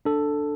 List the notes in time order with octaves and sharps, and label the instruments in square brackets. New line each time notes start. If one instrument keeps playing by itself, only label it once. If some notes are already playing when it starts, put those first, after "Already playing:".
[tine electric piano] D4 A4